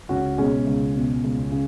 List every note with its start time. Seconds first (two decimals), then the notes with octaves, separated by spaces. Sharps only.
0.09 C#2 C#4 F#4
0.38 B2 G#3 C#4
0.67 C#2
0.96 B2
1.24 C#2
1.52 C#3